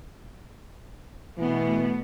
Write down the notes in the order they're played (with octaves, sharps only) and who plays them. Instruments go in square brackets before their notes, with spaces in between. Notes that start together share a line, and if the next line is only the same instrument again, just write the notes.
[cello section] B2 A3 B3 [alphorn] E3